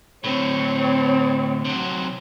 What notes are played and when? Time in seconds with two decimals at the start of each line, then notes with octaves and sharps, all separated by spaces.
0.24 A2 D3 C4 C#5
1.65 C3 F#3